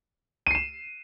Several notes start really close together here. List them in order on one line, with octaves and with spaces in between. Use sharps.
D#7 C7 E7